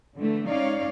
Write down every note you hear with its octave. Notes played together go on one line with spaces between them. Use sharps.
D3 E3 A3
G#3 C#4 D#4 C#5 D5 F5